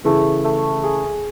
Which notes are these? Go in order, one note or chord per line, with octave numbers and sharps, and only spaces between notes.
C#3 E3 A3
A3
G#4